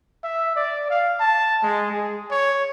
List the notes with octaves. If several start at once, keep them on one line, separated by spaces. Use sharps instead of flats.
E5
D5
F5
A5
G#3
G#4
C#5